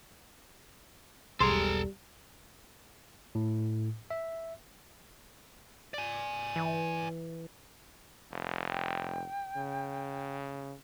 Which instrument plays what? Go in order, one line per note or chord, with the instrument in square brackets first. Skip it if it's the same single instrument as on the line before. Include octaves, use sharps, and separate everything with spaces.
[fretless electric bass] E1 B1 [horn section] G3 [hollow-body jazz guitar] G#4 C6 [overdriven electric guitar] A4 A#5
[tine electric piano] A2
E5
[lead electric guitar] D5 G#5
[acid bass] E3
[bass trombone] F1
[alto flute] G5
[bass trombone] C#3